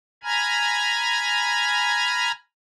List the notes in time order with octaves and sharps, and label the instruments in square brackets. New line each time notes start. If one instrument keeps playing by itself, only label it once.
[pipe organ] G#5 A#5 B5 F6 G#6